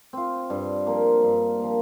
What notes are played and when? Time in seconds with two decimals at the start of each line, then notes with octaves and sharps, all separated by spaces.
0.13 C4 F4
0.50 G2
0.87 F3 A#3
1.23 G2
1.60 F3 A#3